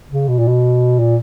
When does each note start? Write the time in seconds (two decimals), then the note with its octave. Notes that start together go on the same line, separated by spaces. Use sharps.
0.11 C#3
0.28 B2
0.39 A#2
0.48 B2
0.99 A#2